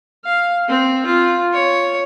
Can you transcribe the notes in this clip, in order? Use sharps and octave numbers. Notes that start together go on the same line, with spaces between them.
F5
C4
F4
C#5